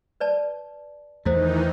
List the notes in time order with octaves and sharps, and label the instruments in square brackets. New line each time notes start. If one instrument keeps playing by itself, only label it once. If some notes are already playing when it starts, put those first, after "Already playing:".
[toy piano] B4 D5 A5
[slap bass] E2 A3 [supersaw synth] D#3 E3 D#4 [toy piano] E4 A4 C5